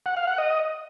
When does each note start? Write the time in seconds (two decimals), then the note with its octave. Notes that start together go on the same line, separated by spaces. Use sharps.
0.06 F#5
0.17 F5
0.27 F#5
0.38 D#5